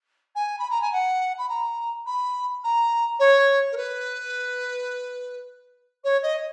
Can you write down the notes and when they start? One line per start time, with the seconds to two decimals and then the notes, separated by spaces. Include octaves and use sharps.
0.35 G#5
0.58 B5
0.70 A#5
0.81 G#5
0.92 F#5
1.38 B5
1.48 A#5
2.06 B5
2.63 A#5
3.19 C#5
3.71 A#4
3.77 B4
6.04 C#5
6.22 D#5